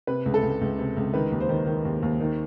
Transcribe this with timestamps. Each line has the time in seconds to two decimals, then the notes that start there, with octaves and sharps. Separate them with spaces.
0.07 C3 B4
0.26 C#2
0.34 A4
0.43 C#2
0.61 C#2
0.79 C3
0.97 C#2
1.14 D#3 B4
1.31 D#2
1.40 C5
1.49 D#3
1.66 D#3
1.85 D#2
2.02 D#2
2.20 D#3